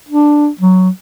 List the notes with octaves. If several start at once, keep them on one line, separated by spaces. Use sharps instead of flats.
D4
F#3